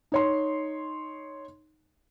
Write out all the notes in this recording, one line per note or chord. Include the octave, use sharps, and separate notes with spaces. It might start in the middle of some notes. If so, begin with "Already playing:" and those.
D#4 C#5 C6